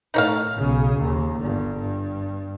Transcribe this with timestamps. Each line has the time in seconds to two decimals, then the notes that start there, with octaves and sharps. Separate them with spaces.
0.14 A2 D#4 C#5 F5
0.58 B1 C#3
0.97 D#2
1.40 G1 G2
1.79 G2